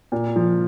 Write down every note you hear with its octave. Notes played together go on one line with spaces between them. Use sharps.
A#2
F3